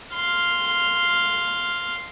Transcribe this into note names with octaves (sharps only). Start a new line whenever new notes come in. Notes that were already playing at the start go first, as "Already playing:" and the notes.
F5 C6